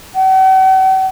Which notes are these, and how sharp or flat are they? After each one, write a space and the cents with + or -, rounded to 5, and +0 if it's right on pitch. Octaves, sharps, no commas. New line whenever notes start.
F#5 +45